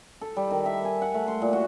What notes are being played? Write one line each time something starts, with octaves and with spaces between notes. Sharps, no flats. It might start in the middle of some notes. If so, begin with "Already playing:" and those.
A4
G3
D#3
E5
G#5
F#5
A3
C6
A#2
F#4